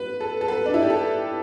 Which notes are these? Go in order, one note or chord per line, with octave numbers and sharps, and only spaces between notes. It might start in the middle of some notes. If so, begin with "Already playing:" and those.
Already playing: B4
A4
A4
B4
D4
E4
G4
A4